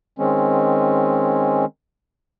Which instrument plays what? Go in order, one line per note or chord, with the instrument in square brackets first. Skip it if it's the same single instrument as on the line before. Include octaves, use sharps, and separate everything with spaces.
[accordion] D#3 G#3 C4 C#4